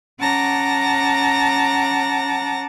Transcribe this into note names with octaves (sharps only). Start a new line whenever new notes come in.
C#4 F#5 A5 A#5 D6 A#6